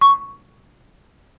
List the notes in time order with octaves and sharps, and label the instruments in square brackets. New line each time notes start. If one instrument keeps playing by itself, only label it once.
[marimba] C#6